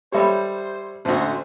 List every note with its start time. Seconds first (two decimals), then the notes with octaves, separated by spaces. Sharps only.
0.12 G3 G4 A4 C5 C#5 E5 B5
1.05 A1 D2 A3 F#4 C5